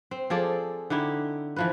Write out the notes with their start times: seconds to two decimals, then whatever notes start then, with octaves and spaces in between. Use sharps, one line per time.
0.11 C4
0.30 F3 G#4 A4 D5
0.90 D3 D#4 E4 G4
1.56 E3 F3 B4